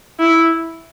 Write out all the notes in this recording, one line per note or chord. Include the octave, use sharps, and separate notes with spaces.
E4